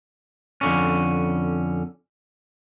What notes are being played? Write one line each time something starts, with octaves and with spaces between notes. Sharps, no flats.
F2 D3 C#4